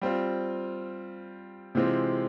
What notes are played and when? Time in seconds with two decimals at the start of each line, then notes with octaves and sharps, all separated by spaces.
0.02 G3 C4 F4
1.75 C3 E3 G#3 C4 F4